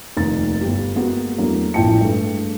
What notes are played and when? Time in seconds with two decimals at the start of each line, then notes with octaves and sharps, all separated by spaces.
0.17 F1 D#2 D#4 A6
0.61 G1 G4
0.95 G#3 A#3 B3 F#4
1.38 E2 F#3 A3 A#3 D4
1.74 A1 E3 F3 G5 A5 C#7
2.01 G2 G#3 A3 D4